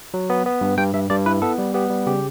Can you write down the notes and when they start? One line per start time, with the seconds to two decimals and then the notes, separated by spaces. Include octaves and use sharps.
0.14 F#3
0.30 B3
0.46 B3
0.61 G2
0.77 G2 G5
0.94 G2 E5
1.10 G2 D5
1.26 E4 B4
1.42 B3 A4
1.58 G3
1.74 B3 G4
1.90 G3
2.07 C#3 G4